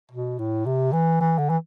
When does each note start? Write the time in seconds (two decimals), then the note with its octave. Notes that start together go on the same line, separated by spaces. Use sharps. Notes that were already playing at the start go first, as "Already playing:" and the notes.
0.11 B2
0.39 A2
0.66 C3
0.92 E3
1.20 E3
1.38 D3
1.49 E3